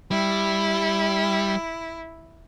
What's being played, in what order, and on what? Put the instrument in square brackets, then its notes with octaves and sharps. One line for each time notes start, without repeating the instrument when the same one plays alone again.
[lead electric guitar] G3 [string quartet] E4